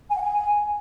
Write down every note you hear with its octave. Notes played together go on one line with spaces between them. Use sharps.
G#5
F#5
G#5